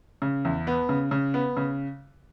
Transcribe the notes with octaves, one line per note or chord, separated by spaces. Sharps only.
C#3
E2
B3
C#3
C#3
B3
C#3